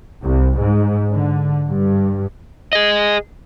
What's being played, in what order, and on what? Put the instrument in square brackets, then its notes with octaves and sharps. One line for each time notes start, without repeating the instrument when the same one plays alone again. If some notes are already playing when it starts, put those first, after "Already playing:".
[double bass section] C2
G#2
D3
G2
[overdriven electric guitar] G#4 D#5